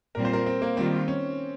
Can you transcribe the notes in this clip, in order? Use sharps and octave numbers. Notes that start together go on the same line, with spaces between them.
A#2 G3 C4 F4 A#4
C5
A#4
C4
A#3
D#3 G3 A#3 C4 F4
C#4